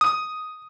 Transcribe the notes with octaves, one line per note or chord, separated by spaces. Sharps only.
D#6